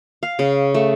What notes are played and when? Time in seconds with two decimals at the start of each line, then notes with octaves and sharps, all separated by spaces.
0.23 F5
0.39 C#3
0.74 A3